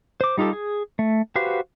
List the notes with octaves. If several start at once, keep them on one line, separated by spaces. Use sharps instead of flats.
C5 D6
G3 D#4 F4 G4 A4
G#4
A3
F#4 G4 B4 C5 F5